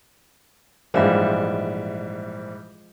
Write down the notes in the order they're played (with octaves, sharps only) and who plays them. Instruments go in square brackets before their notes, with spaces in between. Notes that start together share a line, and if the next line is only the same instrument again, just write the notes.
[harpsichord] A#1 E5 [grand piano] G#2 E3 G3 [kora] F3 G#3